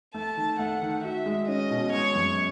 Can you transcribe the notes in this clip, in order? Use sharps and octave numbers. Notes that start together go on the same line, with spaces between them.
A3 A5
D#3
A3 F#5
D#3
F#4 E5
G#3
C#4 D#5
B2
G#3 C#5
F#2